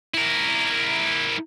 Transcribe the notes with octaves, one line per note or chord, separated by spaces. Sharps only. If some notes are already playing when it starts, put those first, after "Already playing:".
E4 A#4